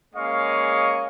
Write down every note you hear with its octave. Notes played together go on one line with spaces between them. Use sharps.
G#3 A#3 C#4 D#5 F5 C#6